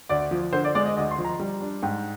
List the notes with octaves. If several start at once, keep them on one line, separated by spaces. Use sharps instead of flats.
D2 D5
F3
D3 C5
D5
G#3 D5
D#5
D2 D#5
C6
F3
A#5
G3
D4
G#2 G5